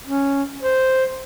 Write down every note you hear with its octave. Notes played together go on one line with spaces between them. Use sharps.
C#4
C5